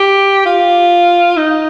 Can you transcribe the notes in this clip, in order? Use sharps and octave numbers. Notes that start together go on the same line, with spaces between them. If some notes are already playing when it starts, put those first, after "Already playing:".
Already playing: G4
F4
D#4